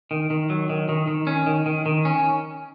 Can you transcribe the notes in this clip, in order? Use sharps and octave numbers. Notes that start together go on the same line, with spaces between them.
D#3
D#3
F#3
D#3
D#3
D#3
C#4
D#3
D#3
D#3
C#4